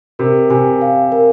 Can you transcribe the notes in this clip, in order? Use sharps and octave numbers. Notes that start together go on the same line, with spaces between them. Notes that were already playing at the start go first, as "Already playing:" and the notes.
C3 A#4
C3 G#5
F5
A#4